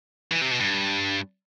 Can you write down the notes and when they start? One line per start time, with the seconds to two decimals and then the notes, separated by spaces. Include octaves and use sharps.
0.32 E3
0.41 C3
0.51 B2
0.60 G2